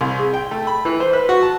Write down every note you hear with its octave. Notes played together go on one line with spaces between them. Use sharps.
C2
G#4
G5
A3
B5
E3
C5
B4
F#4
A5